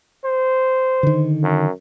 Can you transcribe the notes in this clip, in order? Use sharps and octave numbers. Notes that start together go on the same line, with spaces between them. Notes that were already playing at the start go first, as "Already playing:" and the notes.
C5
D3 D#3
F#2